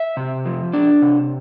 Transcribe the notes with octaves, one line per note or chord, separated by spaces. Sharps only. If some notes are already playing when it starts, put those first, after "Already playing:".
Already playing: E5
C3
F3
D4
C3